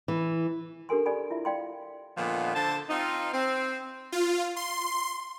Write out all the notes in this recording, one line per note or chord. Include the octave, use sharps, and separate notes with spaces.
E3
D4 G4 A4 A#4 G#5 C6
G4 A4 D5 G#5 B5
E4 F4 E5
D5 F5 G5 B5 C6
A#2 D3 D#3 F3 B3
D3 A4 C5 A5
C4 D#4 F4
C4
F4
C6